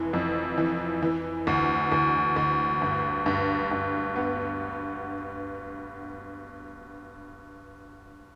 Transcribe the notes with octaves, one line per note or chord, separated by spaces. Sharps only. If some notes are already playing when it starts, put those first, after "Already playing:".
Already playing: F1 E3
F2
E3
E3
D2
D2
D2
G2
G2
G2
B3